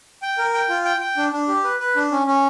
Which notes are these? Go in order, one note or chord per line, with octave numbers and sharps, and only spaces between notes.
G5
A#4
G5
F4
G5
G5
D4
D4
G4
B4
B4
D4
C#4
C#4